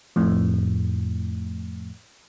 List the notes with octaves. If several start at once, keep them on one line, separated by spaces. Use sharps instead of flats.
F2 A2